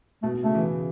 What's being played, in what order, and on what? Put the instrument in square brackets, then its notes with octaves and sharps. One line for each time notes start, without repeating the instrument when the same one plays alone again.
[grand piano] B2 [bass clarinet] A3
[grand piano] B2
[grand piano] C#3 [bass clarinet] A3
[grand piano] E3
C#3